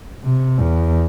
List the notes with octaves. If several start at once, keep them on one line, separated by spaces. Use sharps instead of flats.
C3
E2